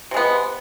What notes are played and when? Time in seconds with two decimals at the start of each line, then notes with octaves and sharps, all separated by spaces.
0.11 C3
0.14 G#3
0.17 B3